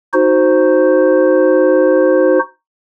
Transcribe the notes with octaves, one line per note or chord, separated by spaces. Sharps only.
D#4 F#4 C5